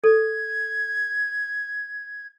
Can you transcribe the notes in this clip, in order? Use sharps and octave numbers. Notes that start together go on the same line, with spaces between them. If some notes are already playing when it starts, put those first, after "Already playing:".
A4 G#6